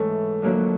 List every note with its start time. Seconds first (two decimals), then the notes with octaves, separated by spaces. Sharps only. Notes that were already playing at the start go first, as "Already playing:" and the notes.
Already playing: G#2 E3 G#3 A3 C#4
0.42 F2 D3 F#3 A#3